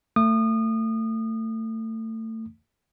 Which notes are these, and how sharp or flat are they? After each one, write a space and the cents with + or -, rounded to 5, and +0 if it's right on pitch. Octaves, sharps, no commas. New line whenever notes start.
A3 +25 D#6 -30